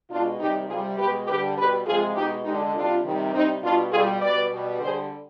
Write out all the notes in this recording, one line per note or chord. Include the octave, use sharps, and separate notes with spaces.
B2 G#3 D4 F4
C3 D#3 G3 D#4 G4
C3 G3 F4 G#4
B2 G#3 G4 B4
D3 G3 G4 B4
B2 G3 G4 B4
C3 F3 G#3 F4 G#4
B2 G#3 D#4 G4
D3 G#3 D#4 G4
C3 G3 D4 F4
C3 D#3 G3
C3 G3 C4 D#4
B2 G3 D4 F4
B2 G3 F4 G#4
B2 G3 B4 D5
B2 G3
D3 G3 G#4 C5